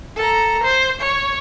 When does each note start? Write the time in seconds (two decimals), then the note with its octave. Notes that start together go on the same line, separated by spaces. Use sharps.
0.16 A4 A#5
0.63 C5
1.01 C#5